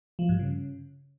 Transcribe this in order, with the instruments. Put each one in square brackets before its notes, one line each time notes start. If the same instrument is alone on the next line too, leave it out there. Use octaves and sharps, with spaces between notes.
[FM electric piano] F3
G2
C#3